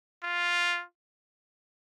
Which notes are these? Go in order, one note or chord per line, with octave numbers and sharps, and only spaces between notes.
F4